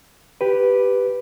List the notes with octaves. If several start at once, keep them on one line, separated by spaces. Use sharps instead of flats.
G4 B4